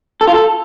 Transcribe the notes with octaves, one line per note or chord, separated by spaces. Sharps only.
A4
F4
A4